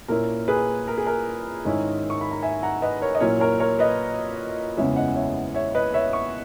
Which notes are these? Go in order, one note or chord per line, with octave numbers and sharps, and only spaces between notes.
A#2 A#3 C#4 E4 A#4
G#4 B4
A#4
G#4
A#4
G#2 D#3 G#3 C#4 E4
C#6
B5
A#5
E5 G#5
F#5 A#5
B4 D#5
A#4 C#5
D#5
A#2 F#3 C#4 E4 A#4 C#5
A#4 C#5
A#4 C#5
B4 D#5
F#1 E2 C#3 E3 G#3 C#5 E5
D#5 F#5
C#5 E5
C#5 E5
B4 D#5
C#5 E5
C#6